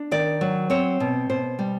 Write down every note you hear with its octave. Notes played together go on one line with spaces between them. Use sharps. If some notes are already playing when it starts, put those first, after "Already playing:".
Already playing: D4
D#3 D5
F#3
C4 C#5
B2
B2 C5
G3